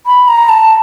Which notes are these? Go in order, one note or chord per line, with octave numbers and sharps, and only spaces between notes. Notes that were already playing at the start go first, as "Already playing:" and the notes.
B5
A#5
A5